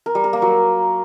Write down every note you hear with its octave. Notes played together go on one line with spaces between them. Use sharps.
A#4
G3
A#4
A#3
F#3